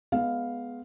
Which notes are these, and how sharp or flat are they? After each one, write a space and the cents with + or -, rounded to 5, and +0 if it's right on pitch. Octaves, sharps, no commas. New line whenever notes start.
G#3 +25 B3 +0 F5 +0